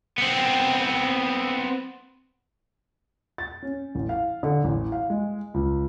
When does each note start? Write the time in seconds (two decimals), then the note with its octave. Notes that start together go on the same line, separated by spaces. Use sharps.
0.18 B3 C4
3.38 A6
3.62 C#4
3.95 A1
4.09 F5
4.43 D3
4.64 A1
4.92 F5
5.10 G#3
5.54 C#2